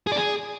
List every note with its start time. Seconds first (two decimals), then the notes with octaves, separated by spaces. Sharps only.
0.07 G#4
0.12 D5
0.17 G#4